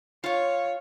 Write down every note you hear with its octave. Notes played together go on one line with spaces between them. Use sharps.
F4 C#5 F5